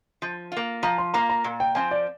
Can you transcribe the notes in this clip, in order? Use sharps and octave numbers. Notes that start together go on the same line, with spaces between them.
F3
A#3 F4
F3 A#5
C6
A#3 F4 A#5
A#5
A#2
G5
F3 C4 G#5
D5